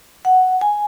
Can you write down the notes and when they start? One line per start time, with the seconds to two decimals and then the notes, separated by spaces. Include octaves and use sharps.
0.25 F#5
0.61 G#5